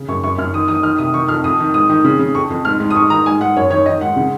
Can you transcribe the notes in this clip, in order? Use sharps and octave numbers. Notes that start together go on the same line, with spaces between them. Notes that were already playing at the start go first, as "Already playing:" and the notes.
Already playing: C#3
F#2 C#6
F#2 C#6
F#2 F6
D#3 D#6
D#3 D#6
D#3 F6
C3 D#6
D#3 C#6
F2 F6
F2 D#6
D#3
G#2 D#6
D#3
C#3
C#3
F2 C#6
F2
G#2 F6
G#2
D#6
G#2 C#6
D#3 A#5
G#2 G#5
G#2 F#5
F#2 C#5
D#3 C#5
D#3 D#5
G#2 F#5
C#3 F#5